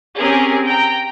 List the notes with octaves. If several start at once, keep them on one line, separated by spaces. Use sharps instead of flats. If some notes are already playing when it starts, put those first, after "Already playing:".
C4 C#4 G4 G#4 A#4
G5 A#5